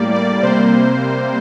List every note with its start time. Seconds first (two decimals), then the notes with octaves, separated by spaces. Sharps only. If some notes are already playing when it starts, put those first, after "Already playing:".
Already playing: A2 G3 A#3 D5
0.13 D5
0.42 C3 G3 A#3 C5